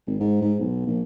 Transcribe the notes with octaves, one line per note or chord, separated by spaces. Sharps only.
G#1
G#2
G#2
B1
A#1